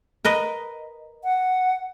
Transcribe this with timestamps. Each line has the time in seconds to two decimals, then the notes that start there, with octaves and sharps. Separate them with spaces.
0.25 A#4 B4 D#5
1.24 F#5